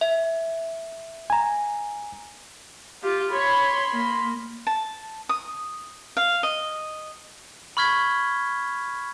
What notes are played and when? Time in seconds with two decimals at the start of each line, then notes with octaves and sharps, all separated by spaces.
0.01 E5
1.30 G#5 A#5
3.03 F4 G4
3.33 C#5 B5 C6
3.92 A#3
4.67 A5
5.29 D#6
6.17 F5
6.43 D#5
7.77 B5 C#6 F6 G#6 B6 G7